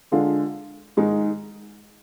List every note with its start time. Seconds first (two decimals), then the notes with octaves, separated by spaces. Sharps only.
0.11 D3 G#3 D4 F4
0.97 G#2 D#3 G#3 D#4